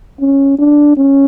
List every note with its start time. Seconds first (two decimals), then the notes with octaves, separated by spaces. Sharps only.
0.20 C#4
0.59 D4
0.97 C#4